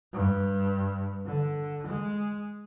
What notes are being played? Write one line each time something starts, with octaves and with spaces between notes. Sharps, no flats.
G2
D3
G#3